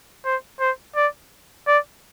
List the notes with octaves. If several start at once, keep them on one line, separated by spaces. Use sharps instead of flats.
C5
C5
D5
D5